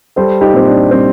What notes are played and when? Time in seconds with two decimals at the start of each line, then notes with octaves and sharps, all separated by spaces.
0.16 G3 A4 C5
0.41 D#4 G4
0.54 A#2 C4
0.67 D4
0.91 G3 C4